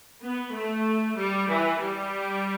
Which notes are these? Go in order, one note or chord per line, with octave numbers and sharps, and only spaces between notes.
B3
A3
G3
E3
G3